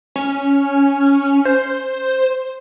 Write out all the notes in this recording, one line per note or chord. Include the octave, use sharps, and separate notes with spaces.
C#4
C5